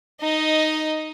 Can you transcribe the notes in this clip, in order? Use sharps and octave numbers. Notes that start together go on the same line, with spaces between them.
D#4 D#5